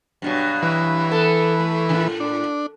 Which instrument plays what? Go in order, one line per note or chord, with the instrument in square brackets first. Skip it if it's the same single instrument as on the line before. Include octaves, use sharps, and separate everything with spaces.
[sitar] G2 B2 F#3
[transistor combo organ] E3 B4
[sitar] B3 A4
A3
A2 D3
[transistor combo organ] D4